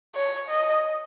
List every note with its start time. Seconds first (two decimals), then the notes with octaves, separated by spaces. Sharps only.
0.15 C#5
0.49 D#5